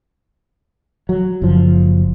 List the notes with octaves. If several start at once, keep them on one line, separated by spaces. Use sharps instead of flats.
F#3
F#1 F3